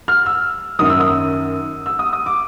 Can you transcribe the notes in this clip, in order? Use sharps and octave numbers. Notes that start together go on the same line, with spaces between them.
F6
E6
F#2 D#3 F#3 D#6
E6
D#6
E6
D#6
D#6
D6